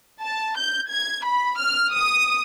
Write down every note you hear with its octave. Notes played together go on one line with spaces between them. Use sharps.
A5
G6
G#6
B5
F6
D#6